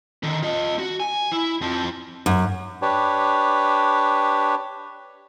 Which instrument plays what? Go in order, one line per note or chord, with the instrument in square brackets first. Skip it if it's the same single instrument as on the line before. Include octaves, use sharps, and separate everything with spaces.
[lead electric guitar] D3 D#3
F4 D#5
F#4
G#5
E4
F2 F3
[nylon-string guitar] F#2
[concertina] D4 G4 B4 C#5